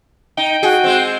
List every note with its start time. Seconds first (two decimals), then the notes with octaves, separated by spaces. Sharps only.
0.37 D#4 G5
0.63 F#4 G#4
0.84 G#3 C4